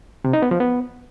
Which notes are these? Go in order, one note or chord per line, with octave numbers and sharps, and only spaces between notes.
C3
D#4
B3
F3
B3